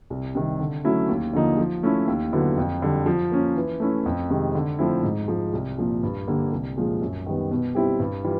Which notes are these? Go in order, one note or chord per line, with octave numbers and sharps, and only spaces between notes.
C2
C3 D#3 G3
D3
F#3 A3 C#4 E4
D#2
D3 F3 A#3 D#4
F3
A3 C#4 E4
D#2
D3 F#3 B3 E4
F2
D3 G3
F3
A#3 C#4
E3
A3 C#4 E4
F2
C3 D#3 G#3
D3
F3 A3 C4 E4
G#2
F3 G#3
C2
A#2 F3
G2
D3 G3 A#3
C2
A#2 F3 G#3
F#2
D#3 G3 B3
B2
G3 C4 E4 G4
G2
E3 G3 F4